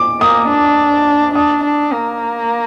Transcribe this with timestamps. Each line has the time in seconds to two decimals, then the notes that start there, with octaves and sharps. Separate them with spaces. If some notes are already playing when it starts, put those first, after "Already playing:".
Already playing: D6
0.21 A#3 D#6
0.49 D4
1.34 D4 D#6
1.63 D4
1.92 A#3